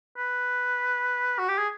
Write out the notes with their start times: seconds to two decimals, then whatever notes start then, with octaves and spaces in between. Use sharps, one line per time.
0.18 B4
1.39 F#4
1.48 G4
1.58 G#4